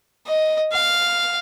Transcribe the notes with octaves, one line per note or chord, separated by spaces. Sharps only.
D#5
F5